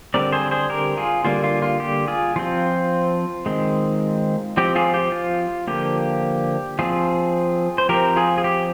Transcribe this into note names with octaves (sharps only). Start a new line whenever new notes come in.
D3 G3 C4 A#4 D5
G#4 C5
G#4 C5
G4 A#4
F4 G#4
D3 G3 A#3 F4
F4
F4
G4
F4 G#4
F3 C4 F4
D#3 G#3 C4
F3 C4 G4
F4 G#4
G4
F4
D3 F3 A#3 G4
F3 C4 F4 G#4
C5
F3 C4 G4 A#4
F4 G#4
G#4
G4